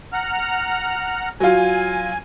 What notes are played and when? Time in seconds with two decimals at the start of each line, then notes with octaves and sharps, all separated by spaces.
0.13 F#5 A#5 F6
1.40 F#3 F4 G#5